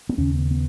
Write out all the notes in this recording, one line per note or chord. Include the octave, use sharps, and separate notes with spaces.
B3
D#2 C#3 C#4
B3
B3